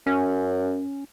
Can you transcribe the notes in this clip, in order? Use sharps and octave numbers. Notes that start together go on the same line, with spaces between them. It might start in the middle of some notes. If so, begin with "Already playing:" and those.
F#2 C#4